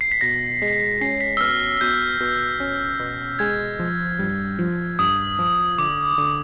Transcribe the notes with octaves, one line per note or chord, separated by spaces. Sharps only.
C7
B6
B2 A#6
G#3
C#4 C7
B6
E6
B2 F6
B2 G6
B2
C#4
B2
G#3 G#6
F3
G2
F3
G2 D#6
F3
D3 D6
D3